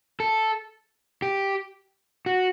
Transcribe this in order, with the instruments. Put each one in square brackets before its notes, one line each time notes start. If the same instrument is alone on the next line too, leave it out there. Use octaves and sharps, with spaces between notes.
[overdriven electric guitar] A4
G4
F#4